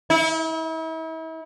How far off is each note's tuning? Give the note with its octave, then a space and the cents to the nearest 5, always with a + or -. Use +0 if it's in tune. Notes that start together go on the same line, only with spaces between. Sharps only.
E4 -40